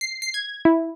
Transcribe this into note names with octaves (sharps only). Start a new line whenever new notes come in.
C7
C7
G#6
E4